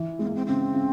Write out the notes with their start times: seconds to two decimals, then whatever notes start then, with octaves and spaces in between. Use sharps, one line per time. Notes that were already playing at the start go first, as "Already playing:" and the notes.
Already playing: E3
0.19 G#3 C4
0.27 A#3
0.35 C4
0.47 C#3 C4
0.74 C#3